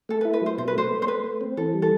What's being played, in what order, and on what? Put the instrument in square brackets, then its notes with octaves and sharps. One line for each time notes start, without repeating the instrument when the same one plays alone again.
[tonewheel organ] A3 [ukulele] A4
[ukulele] B4
[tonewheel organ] E4
[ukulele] B4
[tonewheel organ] F#3 [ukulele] C5
[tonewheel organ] B2 [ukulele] C5
[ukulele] B4
[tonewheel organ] A3 [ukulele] C5
[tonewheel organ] A3
[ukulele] C5
[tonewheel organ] A3 [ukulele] B4
[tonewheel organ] A3
C4
[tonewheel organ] E3 [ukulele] A4
[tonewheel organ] G3
[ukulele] A4